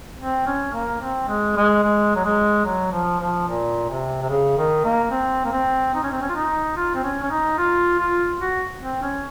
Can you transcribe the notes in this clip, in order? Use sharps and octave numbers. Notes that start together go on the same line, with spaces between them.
C4
C#4
A#3
C4
G#3
G#3
G#3
F#3
G#3
F#3
F3
F3
A#2
C3
C3
C#3
D#3
A#3
C4
A#3
C4
D#4
C#4
C4
C#4
F4
D#4
F4
C4
C#4
C#4
D#4
F4
F4
F#4
C4
C#4